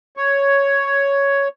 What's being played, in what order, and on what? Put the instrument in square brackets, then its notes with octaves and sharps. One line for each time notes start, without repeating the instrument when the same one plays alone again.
[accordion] C#5